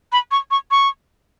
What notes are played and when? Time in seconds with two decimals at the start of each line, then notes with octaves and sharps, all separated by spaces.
0.12 B5
0.31 C#6
0.51 C#6
0.71 C#6